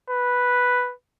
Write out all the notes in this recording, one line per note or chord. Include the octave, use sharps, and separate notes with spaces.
B4